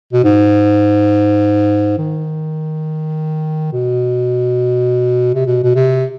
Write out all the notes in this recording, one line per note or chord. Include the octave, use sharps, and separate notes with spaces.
B2
G#2
D#3
B2
C3
B2
B2
C3